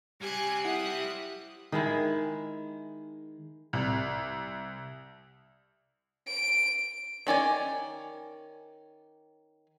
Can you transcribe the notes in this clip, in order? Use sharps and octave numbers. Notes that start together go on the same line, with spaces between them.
G3 C4 G4 G#5 F#6 G#6
E4 E5 F#5 D#6 F#6
D#3 G#3 E4
C2
D7
D#3 C#4 D5 G#5